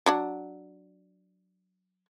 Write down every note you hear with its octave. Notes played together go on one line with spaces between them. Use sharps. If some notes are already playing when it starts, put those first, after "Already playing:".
F#3 D4 F#5